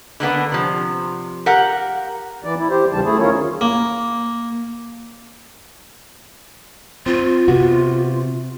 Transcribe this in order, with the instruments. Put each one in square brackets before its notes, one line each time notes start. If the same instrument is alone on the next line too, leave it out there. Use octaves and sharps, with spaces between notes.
[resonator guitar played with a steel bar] D3 A#3 B3 D4
C3 F3
G4 A#4 F5 F#5
[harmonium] E3 D5
E4
G4 C5
D#2 C#3 E3 G3 A5
A3 E4 G#4
D#3 C#4 F4 A#4 C#5
[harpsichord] A#3
[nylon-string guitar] C4 [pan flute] F4
[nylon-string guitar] C3 B3 F#4